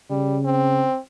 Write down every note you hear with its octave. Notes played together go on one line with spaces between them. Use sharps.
C#3 G3
C4